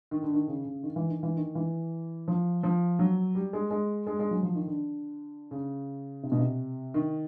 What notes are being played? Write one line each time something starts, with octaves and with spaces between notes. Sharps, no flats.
D#3
D3
D#3
C#3
C#3
D#3
E3
D#3
E3
D#3
E3
F3
F3
F#3
G3
G#3
G#3
G#3
G#3
F#3
F3
D#3
D3
C#3
C3
B2
C3
D#3